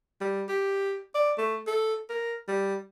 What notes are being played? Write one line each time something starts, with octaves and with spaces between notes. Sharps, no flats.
G3
G4
D5
A3
A4
A#4
G3